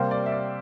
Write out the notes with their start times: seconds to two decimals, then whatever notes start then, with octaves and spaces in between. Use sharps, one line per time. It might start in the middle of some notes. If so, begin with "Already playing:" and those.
Already playing: C3 G3 A#3 C5
0.11 D5
0.26 E5
0.32 D5